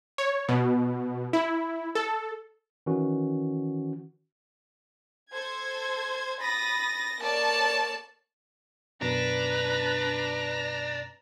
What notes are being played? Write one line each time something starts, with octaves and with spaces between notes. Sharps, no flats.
C#5
B2
E4
A4
D#3 E3 C#4 F#4
A4 C5 G#6
B5 D#6 A6 A#6
A#3 A4 C#5 D5 A5
F#2 B2 D4 B4 A#5